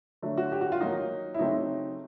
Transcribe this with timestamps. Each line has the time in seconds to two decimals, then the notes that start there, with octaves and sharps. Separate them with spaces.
0.22 D3 F#3 A3
0.37 F#4
0.52 G4
0.61 F#4
0.72 F4
0.81 D#3 F#3 A#3 D#4
1.34 E4
1.39 C#3 F#3 A3 C4 D#4